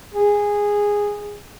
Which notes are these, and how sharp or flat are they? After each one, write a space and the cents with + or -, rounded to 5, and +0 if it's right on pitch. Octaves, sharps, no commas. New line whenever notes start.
G#4 -10